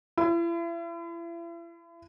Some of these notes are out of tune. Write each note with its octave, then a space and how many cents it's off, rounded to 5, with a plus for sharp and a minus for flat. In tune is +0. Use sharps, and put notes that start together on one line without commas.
E4 +40